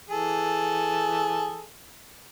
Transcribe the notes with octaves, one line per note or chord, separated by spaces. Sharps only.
E3 G#4 A4